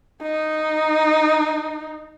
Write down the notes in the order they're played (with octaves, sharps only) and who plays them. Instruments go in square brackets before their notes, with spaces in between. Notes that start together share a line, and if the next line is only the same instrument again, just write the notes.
[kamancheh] D#4